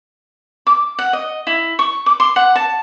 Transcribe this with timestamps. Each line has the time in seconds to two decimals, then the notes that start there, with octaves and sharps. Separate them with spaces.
0.67 D6
0.99 F#5
1.13 D#5
1.47 E4
1.79 C#6
2.06 D6
2.20 C6
2.36 F#5
2.56 A5